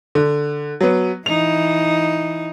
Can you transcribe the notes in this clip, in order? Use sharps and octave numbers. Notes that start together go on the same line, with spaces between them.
D3
F#3 B3
E3 D#4 F7